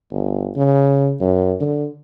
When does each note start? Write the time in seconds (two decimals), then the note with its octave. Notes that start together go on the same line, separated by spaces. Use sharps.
0.11 G1
0.56 C#3
1.21 F#2
1.61 D3